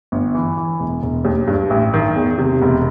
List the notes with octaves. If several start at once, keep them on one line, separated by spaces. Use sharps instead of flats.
G1
E3
E3
E1
E1
D#2
G2
A1
D#3
E2
C3
E1